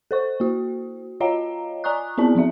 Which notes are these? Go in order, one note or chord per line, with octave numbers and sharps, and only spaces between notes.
A4 C5 C#6
A#3 F#4
F4 C#5 D#5 F5 G5 A#5
D5 G#5 A#5 C#6 D#6 F#6
B3 C4 E4 G#4 D5 A5
F3 C4 D#4 E5